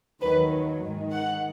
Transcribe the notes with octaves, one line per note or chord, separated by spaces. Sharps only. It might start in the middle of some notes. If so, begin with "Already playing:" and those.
D#2 D#3 F#3 B4
G#2 D#3 G#3
F#5